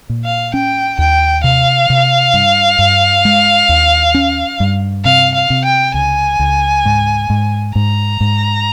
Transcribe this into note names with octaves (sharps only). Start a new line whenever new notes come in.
A#2
F5
C#4 G5
D#2 G5
C3 F5
C3
G2
G2
G#3
D#2
C#4
G2
C3 F5
F5
C3
G5
C#2 G#5
C#2
G#2
G#2
G#2 A#5
G#2